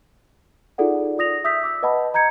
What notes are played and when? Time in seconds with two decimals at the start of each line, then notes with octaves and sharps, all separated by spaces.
0.78 D#4 F4 G#4 A4 D5 F#5
1.18 F4 D5 D#6 A#6 F7
1.44 E5 D#6 E6 G6 B6
1.63 D6 E6
1.83 B4 D#5 F#5 A5 B5
2.14 D#5 A#5 G6 G#6 C#7